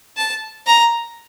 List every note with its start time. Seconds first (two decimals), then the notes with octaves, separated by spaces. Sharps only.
0.17 A5
0.66 A#5